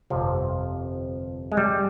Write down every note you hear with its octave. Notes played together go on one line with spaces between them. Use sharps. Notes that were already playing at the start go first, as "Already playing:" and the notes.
G1 F2 C3 F3
G#3
G3